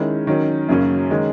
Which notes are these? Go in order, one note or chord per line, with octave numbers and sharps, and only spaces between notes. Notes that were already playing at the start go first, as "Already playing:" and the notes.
Already playing: D#3 G#3 C#4 E4
D#3 F#3 C#4
F#2 C#3 F#3 A#3 C#4
D#3 G#3 C#4